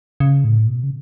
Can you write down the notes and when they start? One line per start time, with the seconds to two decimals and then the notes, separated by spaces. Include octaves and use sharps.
0.20 C#3
0.44 A2
0.67 B2
0.83 C#3